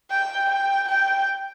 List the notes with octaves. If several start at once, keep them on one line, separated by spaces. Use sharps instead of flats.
G5
G5
G5